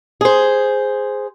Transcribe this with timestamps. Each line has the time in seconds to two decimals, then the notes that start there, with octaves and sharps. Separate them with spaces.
0.21 G#4 C5